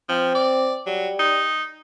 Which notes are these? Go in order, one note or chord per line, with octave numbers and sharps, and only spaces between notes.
F3 C4
D5
F#3 G3
D#4